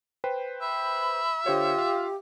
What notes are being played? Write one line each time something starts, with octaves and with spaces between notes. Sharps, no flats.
B4 C5 G5
E5 B5
D3 F4 G4 C5 C#5
F5